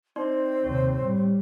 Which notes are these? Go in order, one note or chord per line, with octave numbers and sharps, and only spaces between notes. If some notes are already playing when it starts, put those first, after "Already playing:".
C4 D#4 D5 C6
D#2 C3 C#5
A2 G3